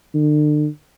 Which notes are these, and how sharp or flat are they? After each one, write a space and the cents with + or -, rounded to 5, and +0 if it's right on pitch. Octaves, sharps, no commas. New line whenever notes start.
D3 +40